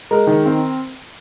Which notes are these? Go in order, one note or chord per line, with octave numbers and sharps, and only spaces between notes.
G#3 A#4
D#3
C4